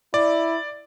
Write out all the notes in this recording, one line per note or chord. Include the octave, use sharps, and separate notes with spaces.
E4 D5